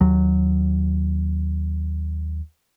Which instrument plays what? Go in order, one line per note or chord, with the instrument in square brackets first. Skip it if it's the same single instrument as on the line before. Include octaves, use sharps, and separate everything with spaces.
[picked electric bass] D#2 F#3